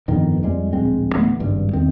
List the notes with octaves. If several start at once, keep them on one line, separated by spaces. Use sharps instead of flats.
G1 F2 B2 D#3
F2 G3 G#3
D1 A#1 G#3 C4
D1 E3 A3 B3
G#1 C#2 G2
E2 D#3 C4